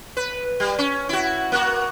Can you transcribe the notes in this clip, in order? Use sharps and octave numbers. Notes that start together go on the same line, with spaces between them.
B4
G3
C#4
E4 F#4
A#3 F#4